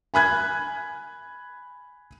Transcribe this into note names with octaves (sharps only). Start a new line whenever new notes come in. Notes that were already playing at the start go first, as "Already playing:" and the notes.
G#5 B5 F#6 G#6